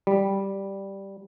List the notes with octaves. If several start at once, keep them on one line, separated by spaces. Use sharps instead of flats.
G3